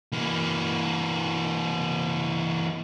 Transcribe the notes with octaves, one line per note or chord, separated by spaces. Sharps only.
E3 A#3